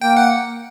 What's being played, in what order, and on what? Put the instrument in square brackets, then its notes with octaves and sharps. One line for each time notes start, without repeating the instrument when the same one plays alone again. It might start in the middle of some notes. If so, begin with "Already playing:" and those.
[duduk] A#3 [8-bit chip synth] G5
[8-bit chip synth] F#5